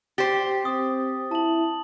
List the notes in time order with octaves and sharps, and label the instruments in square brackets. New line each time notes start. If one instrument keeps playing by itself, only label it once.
[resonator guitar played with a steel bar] G4 C5 [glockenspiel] A6
[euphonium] C4 [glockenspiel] D#6
[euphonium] E4 [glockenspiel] A5 F#7